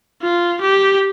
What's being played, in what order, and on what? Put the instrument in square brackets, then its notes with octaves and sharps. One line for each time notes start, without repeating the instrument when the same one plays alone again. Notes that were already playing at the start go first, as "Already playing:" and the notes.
[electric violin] F4
G4